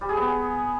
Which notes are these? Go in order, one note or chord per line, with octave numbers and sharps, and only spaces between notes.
G3
G#4
B3